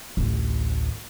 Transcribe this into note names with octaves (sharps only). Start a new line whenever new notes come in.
A1 D2